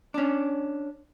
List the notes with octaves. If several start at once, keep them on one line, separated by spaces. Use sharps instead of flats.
C#4 D4